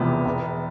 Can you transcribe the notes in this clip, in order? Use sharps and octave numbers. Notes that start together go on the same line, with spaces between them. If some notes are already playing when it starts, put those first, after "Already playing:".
Already playing: E1 E2 C3 F3 B3
E1